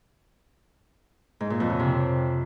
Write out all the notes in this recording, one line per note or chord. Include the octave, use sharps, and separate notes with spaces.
G#2
A#2
F2
C#3
C3